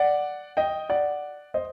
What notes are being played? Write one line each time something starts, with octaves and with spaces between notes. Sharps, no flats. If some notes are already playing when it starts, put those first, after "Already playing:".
Already playing: D5 F#5
D#5 G5
D5 F#5
C5 D#5